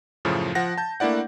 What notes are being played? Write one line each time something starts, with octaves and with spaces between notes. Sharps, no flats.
F#2 A2 C#3 F3
F3 F#5 A#6
A5 G6
A3 A#3 D4 E4 D5 F#5